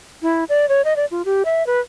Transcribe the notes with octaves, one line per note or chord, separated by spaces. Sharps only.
E4
D5
C#5
D#5
D5
F4
G4
E5
B4